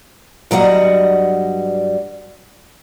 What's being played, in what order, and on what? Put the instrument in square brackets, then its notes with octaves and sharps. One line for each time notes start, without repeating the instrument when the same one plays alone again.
[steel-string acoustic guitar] G2 F#3 G3 D#5 F#5